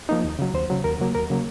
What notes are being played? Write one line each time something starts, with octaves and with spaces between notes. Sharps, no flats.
F3 A#3 D#4
D#2
C#3 F#3
D#2 C5
C#3 F#3
D#2 A#4
C#3 F#3 A#3
D#2 A#4
C#3 F#3 A#3